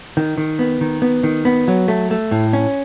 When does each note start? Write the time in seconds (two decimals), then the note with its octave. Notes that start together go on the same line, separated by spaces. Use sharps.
0.17 D#3
0.37 D#3
0.59 B3
0.81 D#3
1.02 B3
1.23 D#3
1.45 B3
1.68 F#3
1.88 A3
2.11 A3
2.31 A2
2.53 C#4